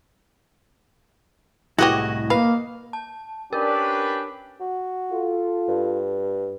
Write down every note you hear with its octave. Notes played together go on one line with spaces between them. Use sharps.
C2 A2 G#3 B3 E4 F#4 G4 D#5
A#3 B4 F5
A5
C#4 D4 G4 A#4 B4
F#4
F4 A4
G2